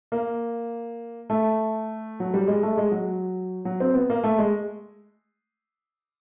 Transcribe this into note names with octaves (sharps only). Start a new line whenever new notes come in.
A#3
A3
F#3
G3
G#3
A3
G#3
F#3
F#3
C4
B3
A#3
A3
G#3